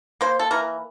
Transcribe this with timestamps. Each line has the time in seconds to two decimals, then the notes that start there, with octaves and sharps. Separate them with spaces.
0.21 A#3 C5
0.39 A4
0.51 E3 A#4